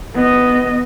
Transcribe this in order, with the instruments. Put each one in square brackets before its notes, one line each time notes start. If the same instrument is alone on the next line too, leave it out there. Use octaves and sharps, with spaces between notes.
[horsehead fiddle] B3 D#5